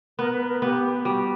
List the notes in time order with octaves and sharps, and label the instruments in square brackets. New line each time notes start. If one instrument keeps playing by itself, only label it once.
[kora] B3 [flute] A#4
[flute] B4
A#4
[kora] B3 [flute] G4
[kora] G3 [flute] F#4